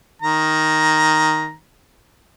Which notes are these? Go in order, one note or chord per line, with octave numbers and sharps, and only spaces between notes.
D#3 A#5